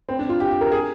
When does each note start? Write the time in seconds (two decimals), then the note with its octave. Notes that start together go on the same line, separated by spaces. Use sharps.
0.09 C4
0.19 D4
0.29 F4
0.40 G4
0.51 G4
0.61 A#4
0.72 G#4